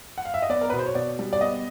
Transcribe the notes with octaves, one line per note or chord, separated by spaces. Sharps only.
F#5
F5
E5
D#5
B3 D5
A#4
B2 B4
C5
C#5
B2 D5
G3
D5
B3 D#5